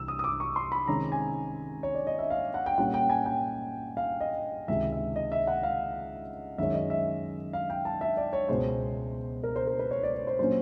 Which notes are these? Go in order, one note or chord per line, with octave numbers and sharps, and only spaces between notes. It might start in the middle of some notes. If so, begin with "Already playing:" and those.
Already playing: C2 E3 E6
D#6
D#6
D6
C#6
C6
B5
C3 D#3 G#3 C#4 A#5
G#5
C#5
D5
D#5
E5
F5
F#5
G5
A#2 G3 A#3 C#4 F#5
G5
G#5
G5
F5
D#5
C#2 C3 D#3 G#3 E5
E5
D#5
E5
F#5
F5
F#2 D#3 G#3 C#4 E5
D#5
E5
F5
G5
A5
E5
D5
C#5
C#2 B2 G#3 B3 C5
A#4
C5
A#4
B4
C#5
D5
C#5
C5
A#2 F#3 A#3 C#4 C5